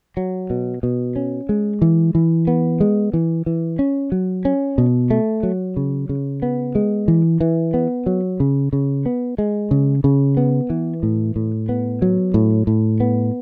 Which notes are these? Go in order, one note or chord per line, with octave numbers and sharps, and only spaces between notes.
F#3
B2
B2
C#4
G#3
E3
E3
B3
G#3
E3
E3
C#4
F#3
C#4
B2
A3
F#3
C#3
C#3
B3
G#3
E3
E3
B3
F#3
C#3
C#3
B3
G#3
C#3
C#3
B3
E3
A2
A2
B3
F#3
A2
A2
B3